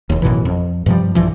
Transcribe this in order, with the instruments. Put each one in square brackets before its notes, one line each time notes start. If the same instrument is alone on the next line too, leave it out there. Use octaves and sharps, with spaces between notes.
[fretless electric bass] E1 D#2
A1 F#2 B2 E3
F2
G2 C3 F3 G3
A#1 G2 E3 F3